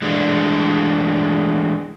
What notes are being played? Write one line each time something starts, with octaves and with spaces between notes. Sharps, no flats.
E3 G#3 A3 D4